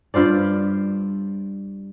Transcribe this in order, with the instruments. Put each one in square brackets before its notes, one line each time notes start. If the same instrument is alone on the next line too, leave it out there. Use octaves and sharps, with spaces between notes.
[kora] G2 F4 C5 D5